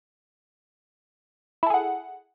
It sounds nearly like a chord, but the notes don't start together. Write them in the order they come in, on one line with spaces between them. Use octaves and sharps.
E4 A4 G#4 F#5